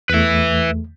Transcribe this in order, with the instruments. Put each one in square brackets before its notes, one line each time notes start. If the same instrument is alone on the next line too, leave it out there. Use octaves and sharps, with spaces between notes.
[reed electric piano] E2 A3 [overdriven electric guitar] B4 E5